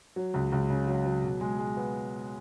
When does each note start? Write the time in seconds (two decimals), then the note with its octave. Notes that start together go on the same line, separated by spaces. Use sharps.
0.16 F#3
0.34 C#2
0.52 C#2
0.70 C#3
0.87 F#3
1.05 F#3
1.23 B2
1.41 G#3
1.59 G#3
1.77 B3